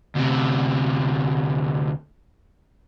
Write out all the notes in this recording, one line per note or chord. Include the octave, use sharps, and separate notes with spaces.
D2 C3